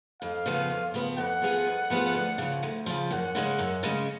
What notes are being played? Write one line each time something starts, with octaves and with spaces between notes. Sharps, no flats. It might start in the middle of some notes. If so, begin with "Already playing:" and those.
F2 F5
C#3 F3 B3
F2
C#3 F3 B3
F2 F#5
F3 B3 F4 G#4
F2
F3 B3 F4 G#4
D2
C#3 F3
D2
C#3 F3
F#2 F#5
C#3 G#3 C#4
F#2
C#3 G#3 C#4